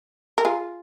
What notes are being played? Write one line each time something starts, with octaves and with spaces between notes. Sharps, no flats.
A#4
F4 G#4